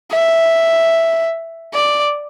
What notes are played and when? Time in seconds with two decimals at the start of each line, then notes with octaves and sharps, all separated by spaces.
0.11 E5
1.74 D5